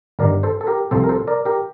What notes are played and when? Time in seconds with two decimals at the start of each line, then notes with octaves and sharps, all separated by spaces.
0.19 G1 G2 D#3 A#4 D5
0.43 A4 C5
0.61 A4
0.67 G4 A#4
0.91 C2 C3 F3 A4 C5
1.04 A#4
1.09 A4 C5
1.28 A#4 D5
1.45 G4 A#4